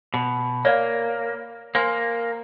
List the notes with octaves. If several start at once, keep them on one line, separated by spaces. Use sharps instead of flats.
B2
A#3 C#5 D5 F5
A#3 C5 G#5 C6